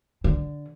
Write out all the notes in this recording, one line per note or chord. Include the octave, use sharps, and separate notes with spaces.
D3